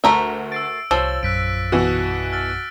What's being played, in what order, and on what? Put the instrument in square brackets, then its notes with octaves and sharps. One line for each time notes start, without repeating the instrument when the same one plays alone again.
[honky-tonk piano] D2 [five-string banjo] A3 A#4 E5
[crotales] E6 D7 [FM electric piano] A6 C7
[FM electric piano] C2 C#5 [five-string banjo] F3 [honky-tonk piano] E6 [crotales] A6
[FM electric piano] A#1 F#2 [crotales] F#6 B6 D7
[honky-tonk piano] B2 E3 F#4 [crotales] E6 F#6
[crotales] E6 F6 A6